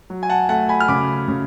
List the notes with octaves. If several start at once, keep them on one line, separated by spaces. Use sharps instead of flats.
F#3
G#5
F#5 A5
A3 F#5 A5
G#5 B5
F6
C#3 B5 D6
C#3